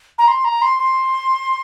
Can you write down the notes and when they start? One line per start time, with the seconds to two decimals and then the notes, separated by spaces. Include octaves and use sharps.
0.18 A#5
0.28 C6
0.44 A#5
0.62 C6
0.79 C6